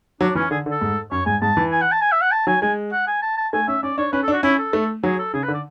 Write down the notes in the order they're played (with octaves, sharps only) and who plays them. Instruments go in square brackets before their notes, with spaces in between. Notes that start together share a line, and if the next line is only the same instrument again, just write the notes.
[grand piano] F#3 [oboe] D4
[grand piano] E3 [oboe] C#4
[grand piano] D3 [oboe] G#4
[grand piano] D3
[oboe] A4
[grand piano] G#2
[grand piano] F#2 [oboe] C#5
[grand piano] G#2 [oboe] G#5
[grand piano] G#2 [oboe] A5
[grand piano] E3
[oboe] G#5
F#5
A5
G#5
E5
F#5
A5
[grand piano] F#3 [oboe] G#5
[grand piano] G#3 [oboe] G#5
[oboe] F#5
G#5
A5
A5
[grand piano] A3 [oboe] G#5
[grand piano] C#4 [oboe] E5
[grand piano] C#4 [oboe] D5
[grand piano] D4 [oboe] C#5
[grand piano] C#4 [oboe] B4
[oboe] A4
[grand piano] D4
[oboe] F#4
[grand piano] C#4 [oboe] E4
[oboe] A4
[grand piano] A3
[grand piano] F#3 [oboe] G#4
[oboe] A4
[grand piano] C#3 [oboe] G#4
[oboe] B4
[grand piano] D3
[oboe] D5